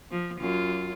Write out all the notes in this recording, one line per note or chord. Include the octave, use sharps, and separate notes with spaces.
F3
F#2 F4